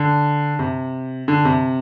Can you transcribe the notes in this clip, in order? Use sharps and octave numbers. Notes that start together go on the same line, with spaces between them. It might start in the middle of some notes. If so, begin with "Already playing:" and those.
Already playing: D3
C3
D3
C3